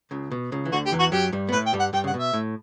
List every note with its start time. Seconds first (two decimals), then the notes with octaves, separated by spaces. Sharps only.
0.11 C#2 C#3
0.32 B2
0.52 C#2 C#3
0.65 E3
0.72 D2 D3 F#4
0.86 G4
0.92 E2 E3
1.00 F#4
1.12 F#2 F#3 G4
1.33 G2 G3
1.49 B3
1.52 A2 A3 B4
1.66 G5
1.73 G2 G3
1.80 F#5
1.93 G2 G3 G5
2.04 C#3 F#5
2.14 B2
2.20 E5
2.33 A2